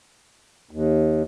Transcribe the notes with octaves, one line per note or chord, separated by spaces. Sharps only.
D#2